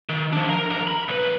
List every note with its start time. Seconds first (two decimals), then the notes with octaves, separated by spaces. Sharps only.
0.09 D#3
0.33 F3 D4
0.50 A#4 A#5
0.70 F2 A#4
0.88 B5
1.08 B1 B4